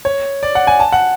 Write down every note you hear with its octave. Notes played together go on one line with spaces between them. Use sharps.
C#5
D5
F#5
G#5
A5
F#5